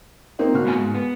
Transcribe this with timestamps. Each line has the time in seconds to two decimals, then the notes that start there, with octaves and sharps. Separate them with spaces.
0.39 A#3 C4 D#4
0.54 B2 F#4 F6
0.65 A2 F5 G#5
0.78 G#2
0.95 B3